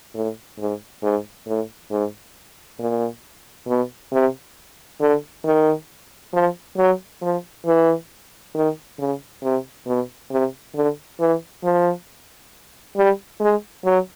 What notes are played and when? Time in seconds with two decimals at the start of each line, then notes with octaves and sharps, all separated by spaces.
0.15 A2
0.59 G#2
1.03 G#2
1.47 A2
1.91 G#2
2.80 A#2
3.68 B2
4.13 C3
5.00 D3
5.45 D#3
6.33 F3
6.78 F#3
7.22 F3
7.66 E3
8.55 D#3
8.99 C#3
9.43 C3
9.87 B2
10.31 C3
10.75 D3
11.20 E3
11.64 F3
12.97 G3
13.40 G#3
13.85 F#3